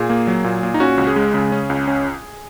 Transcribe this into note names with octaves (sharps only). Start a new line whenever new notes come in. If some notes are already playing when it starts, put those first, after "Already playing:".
Already playing: A#2 G#4
A#3
F#3
A#2
A#2
D#4
C#4 F#4
C#2
G#4
G#3
C#3
C#4
C#2
C#4